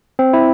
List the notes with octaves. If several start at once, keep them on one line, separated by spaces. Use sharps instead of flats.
C4
E4